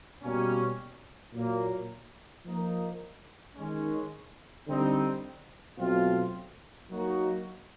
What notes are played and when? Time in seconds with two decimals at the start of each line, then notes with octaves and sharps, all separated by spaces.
0.22 B2 G3 A#3 C#4
1.33 A#2 F#3 A#3
2.45 F3 A#3 D#4
3.56 D#3 G#3 C#4
4.67 D3 G3 C4 D#4
5.79 B2 F#3 A3 C4 F4
6.90 F#3 A#3 D#4 F#4